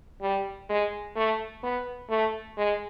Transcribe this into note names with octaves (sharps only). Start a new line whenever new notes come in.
G3
G#3
A3
B3
A3
G#3